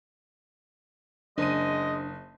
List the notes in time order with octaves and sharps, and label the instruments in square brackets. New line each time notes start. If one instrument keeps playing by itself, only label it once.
[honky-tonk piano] F#1 D#7 [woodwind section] G#3 D#5 [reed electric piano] D4 C5